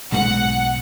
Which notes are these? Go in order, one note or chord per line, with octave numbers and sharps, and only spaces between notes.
B1 G#2 G#3 F#5